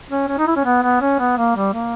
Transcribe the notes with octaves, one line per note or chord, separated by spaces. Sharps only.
C#4
C#4
D#4
E4
C#4
B3
B3
C#4
B3
A#3
G3
A#3